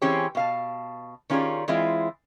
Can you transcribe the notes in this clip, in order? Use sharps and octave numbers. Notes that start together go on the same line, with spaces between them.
E3 C4 C#4 G4 G#4 C#5
B2 F5 A5
D#3 C#4 F4 G4 G#4 D5
E3 G#3 C4 E4 F4